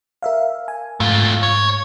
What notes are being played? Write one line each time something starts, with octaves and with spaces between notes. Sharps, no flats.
A#4 E5 F5
G#5
G#2 A3 F4
C#5